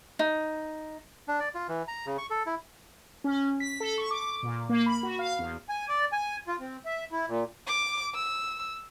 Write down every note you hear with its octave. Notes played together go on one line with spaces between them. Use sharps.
D#4
D4
D5
F4
E3
A#5
C#3
C#6
A4
E4
C#4
B6
A4
C#6
D6
A#2
A#3
B5
F#4
F5
E2
G#5
D5
G#5
F4
C4
E5
E4
A#2
D6
E6